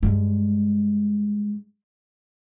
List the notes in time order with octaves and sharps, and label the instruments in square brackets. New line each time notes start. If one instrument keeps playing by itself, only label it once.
[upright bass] G2 G#3